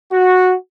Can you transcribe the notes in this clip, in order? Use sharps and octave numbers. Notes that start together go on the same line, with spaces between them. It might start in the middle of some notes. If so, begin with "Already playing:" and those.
F#4